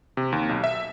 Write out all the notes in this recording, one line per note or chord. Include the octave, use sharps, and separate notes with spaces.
C3
D#2
B1
E5